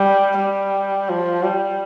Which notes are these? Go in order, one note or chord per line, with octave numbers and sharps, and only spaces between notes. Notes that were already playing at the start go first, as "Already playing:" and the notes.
Already playing: G3
G3
F3
G3